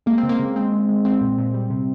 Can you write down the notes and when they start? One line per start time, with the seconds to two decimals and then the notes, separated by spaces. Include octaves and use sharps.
0.06 G#3 A#3
0.18 C4
0.23 C#3
0.29 A#3
0.39 C#3
0.56 G#3 C4
0.72 G#3
0.89 G#3
1.05 G#3 C4
1.21 A#2
1.38 A#2
1.54 G3
1.70 C3